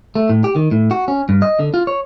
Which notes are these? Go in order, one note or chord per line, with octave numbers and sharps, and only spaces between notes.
A3
A2
G4
D#3
A2
F#4
C#4
G2
D#5
D3
F4
C#5